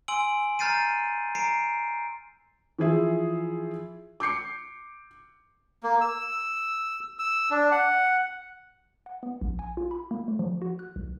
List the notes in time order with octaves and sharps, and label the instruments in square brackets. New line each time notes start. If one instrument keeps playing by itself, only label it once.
[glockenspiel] G#5 C6 E6 D7 F#7
A#5 F6 G6 A6 C7 D#7
A#5 C7 D7
[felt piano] E3 F3 G#4 E5
D6 G6 C7 C#7
[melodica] A#3
E6
E6
D4
F#5
[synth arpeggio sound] F#5
B3
A#1
G#5
F4
B5
A#3
A3
F3
F#4
F#6
B1